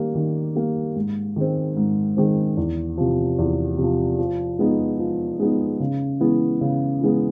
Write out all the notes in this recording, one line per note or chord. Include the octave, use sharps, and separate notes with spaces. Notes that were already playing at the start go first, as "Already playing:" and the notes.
Already playing: D#3 G3 A#3
D#3
G3 A#3
G#2
D#3 G#3 C4
G#2
D#3 G#3 C4
E2
C3 F3
E2
C3 F3
F3
G#3 B3 D#4
F3
G#3 B3 D#4
C#3
E3 G#3 B3
C#3
E3 G#3 B3